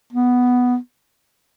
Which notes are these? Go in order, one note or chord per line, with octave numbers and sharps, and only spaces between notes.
B3